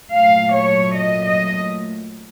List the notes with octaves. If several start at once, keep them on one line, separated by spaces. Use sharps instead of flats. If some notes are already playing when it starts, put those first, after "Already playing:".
A#2 F#3 A3 F5
C#5
D#5
D#5